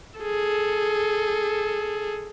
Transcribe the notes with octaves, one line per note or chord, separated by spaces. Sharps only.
G#4 A4